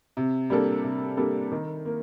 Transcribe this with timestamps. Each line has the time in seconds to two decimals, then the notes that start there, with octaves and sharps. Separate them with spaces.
0.17 C3
0.50 G3 A#3 D4 A4
0.84 C3
1.17 G3 A#3 D4 A4
1.52 D#3
1.85 A#3